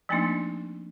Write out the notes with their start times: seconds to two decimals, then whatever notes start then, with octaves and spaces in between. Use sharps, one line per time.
0.09 F3 A3 A#3 C4 D4 D#4